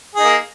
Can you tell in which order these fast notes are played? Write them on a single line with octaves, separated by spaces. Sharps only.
G#4 D#4 A#3